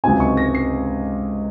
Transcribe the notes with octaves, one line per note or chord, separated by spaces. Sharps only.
C#2 C3 F#3 C4 D#4 G#5
C#6
A#6
C7